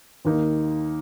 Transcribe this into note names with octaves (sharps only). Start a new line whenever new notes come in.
D#2 D#3 A#3 D#4